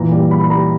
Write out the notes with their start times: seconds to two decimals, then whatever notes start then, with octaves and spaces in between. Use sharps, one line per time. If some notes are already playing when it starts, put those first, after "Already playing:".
Already playing: A#2 E3 A#5
0.12 G3
0.31 G3 B5
0.42 B5
0.50 G3 A#5